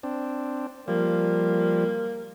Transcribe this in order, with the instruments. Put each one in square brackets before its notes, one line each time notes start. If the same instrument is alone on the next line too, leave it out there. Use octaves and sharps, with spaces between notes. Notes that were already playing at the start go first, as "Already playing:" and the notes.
[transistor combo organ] C4 D4
[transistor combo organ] F3 G3 [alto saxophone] A#3